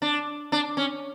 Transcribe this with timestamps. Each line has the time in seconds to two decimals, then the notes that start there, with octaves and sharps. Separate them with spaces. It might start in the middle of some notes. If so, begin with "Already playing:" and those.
0.02 D4
0.52 D4
0.77 C#4